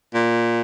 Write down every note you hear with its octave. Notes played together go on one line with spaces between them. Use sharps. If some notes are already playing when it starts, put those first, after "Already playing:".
A#2